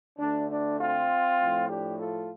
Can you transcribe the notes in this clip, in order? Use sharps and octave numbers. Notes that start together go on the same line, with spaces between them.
D2 D3 A3 D4
D4
C4 F4
A2 F3 A3
D4 G4
F4 A4